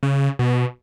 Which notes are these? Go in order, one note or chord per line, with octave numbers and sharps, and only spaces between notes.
C#3
B2